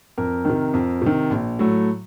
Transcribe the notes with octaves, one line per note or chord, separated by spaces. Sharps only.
F2 A#4
C3 D#3
F2
C3 D#3
A#1
A2 F#3 A3